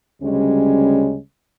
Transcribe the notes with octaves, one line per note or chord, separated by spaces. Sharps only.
D2 C#3 G3 G#3 C#4